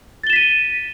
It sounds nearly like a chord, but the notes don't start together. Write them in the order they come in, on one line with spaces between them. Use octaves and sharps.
A6 G7 E7 B6 D#7